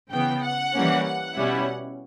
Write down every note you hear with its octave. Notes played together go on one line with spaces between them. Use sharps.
C#3 E3 B3 G5
F#5
E3 G3 A#3 C#4
F#5
B2 G3 C#4 E4